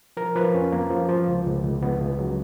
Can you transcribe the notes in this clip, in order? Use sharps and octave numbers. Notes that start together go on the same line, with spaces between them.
F3 A#4
F3 B4
F2 C#4
F2 A#3
F3
F3
C#2
C#2
C#2
C#2 B3
C#2
F#3